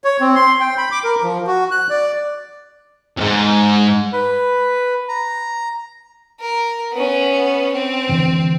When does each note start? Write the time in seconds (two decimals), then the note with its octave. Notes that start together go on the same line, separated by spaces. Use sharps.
0.04 C#5
0.21 C4
0.35 C6
0.60 G5
0.78 B5
0.92 D6
1.04 A#4
1.23 F3
1.47 F#4
1.71 F#6
1.90 D5
3.17 F2 G#2
4.13 B4
5.09 A#5
6.40 A#4
6.93 B3 C#4
7.72 C4
8.09 F2 D3 E3